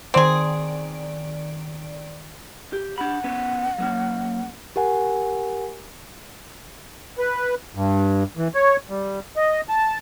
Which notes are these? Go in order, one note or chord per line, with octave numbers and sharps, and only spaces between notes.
D#3 C4 G#4 D5 D7
G4
D4 F#5 B5
B3 C#4
F#3 A#3 C#4
G4 A#4 F#5 G#5
B4
G2
E3
C#5
G3
D#5
A5